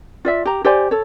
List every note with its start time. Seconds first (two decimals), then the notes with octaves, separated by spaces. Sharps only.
0.25 F4 D5 E5
0.45 G4 A#5
0.64 G4 C5 D5 G#5
0.91 A4 C#5